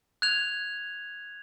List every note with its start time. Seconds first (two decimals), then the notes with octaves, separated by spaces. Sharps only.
0.22 F#6 G#6 F7